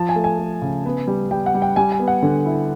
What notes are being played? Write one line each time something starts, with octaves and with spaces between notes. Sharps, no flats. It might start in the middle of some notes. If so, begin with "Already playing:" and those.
Already playing: F3 A5
G#5
A3
G#5
A3
C#3
B3
G3
G3 G5
F#5
G3
G5
G3 G#5
G#5
B3
F#5
D3
E4